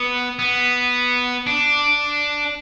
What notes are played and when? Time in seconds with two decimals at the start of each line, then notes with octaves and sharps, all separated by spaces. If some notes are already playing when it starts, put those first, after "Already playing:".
Already playing: B3
0.39 B3
1.47 D4